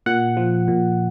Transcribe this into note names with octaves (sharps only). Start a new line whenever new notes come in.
A#2 F#5
F3
A#2